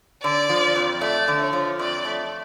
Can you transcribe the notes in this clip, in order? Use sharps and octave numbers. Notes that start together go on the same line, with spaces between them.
D3 D5
F3
F2
A3 D5
D3
C#5
F3
F2 D5
A3